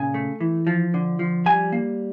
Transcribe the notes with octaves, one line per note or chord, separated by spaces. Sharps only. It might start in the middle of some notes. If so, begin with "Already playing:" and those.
Already playing: A#2 C#3 G#5
A3
E3
F3
D3
F3
G3 G#5
A#3